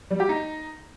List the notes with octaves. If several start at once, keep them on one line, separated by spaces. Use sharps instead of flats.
G3
G4
D#4